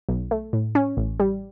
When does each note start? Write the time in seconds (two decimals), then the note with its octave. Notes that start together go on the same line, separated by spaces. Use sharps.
0.09 B1
0.31 A3
0.53 A2
0.75 C#4
0.97 A1
1.20 G3